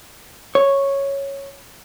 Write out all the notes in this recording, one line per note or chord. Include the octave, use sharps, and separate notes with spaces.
C#5